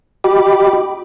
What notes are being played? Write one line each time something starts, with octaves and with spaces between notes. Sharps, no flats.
F#4 G4 D#5 G5 B5 D6